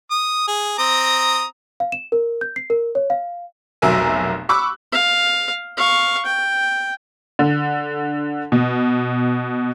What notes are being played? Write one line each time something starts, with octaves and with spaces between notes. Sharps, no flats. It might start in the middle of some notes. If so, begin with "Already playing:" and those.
D#6
G#4
C4 A#5 D#6
F5
E7
A#4
G6
C7
A#4
C#5
F5
F1 B1 F#3 A#4 E5 G#5
B5 C#6 D6 E6 F#6
F5
F5 C#6
G5
D3
B2